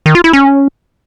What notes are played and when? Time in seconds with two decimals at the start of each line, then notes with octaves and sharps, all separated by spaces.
0.06 D#3
0.15 F4
0.24 E4
0.33 C#4